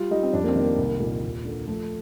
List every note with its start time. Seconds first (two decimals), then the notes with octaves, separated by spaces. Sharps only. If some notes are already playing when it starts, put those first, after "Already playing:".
Already playing: G3 F4
0.11 G3 D#4
0.23 C4
0.33 F2 D4
0.44 A#3
0.49 C4
0.56 D#3
0.63 A#3
0.78 C2
1.00 A#2
1.22 D#2
1.45 D3
1.67 F3 A3